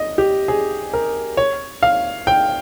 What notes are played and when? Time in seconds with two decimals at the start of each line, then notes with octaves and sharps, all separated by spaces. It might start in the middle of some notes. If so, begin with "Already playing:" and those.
Already playing: D#5
0.18 G4
0.48 G#4
0.93 A#4
1.37 C#5
1.83 F5
2.27 G5